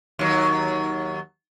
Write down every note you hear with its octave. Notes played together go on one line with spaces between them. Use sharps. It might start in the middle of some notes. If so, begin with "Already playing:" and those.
D#2 F#3